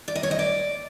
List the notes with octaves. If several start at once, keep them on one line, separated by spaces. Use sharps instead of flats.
D5
D#5
C#5
D#5
D5